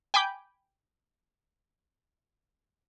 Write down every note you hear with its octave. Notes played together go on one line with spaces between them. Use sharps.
G5 G#5 B5 D6 G6